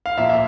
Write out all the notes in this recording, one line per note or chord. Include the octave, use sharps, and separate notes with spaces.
F5
A#2 F3 A#3 E5
E5